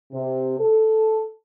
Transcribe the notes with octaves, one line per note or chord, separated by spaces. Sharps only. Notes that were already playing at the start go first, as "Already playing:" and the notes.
C3
A4